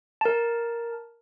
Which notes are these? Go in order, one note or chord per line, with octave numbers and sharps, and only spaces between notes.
A#4 A5